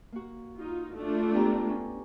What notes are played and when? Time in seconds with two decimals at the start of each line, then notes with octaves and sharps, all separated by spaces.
0.12 A#3 F#4
0.55 D#4 F4
0.95 A3 D4 F4
1.34 B3 G4 A#5
1.69 C#4